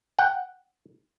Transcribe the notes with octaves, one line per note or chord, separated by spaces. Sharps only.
F#5 G5